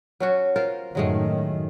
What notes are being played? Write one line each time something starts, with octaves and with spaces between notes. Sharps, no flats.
F#3 C#4 F#4
F4 A#4 C5
F#2 A2 D#3 F#3 G#3 A3